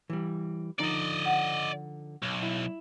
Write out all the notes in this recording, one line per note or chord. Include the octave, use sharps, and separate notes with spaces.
E3 G3
D3 F3 D#4 D5 D#5
F#5
B1
E4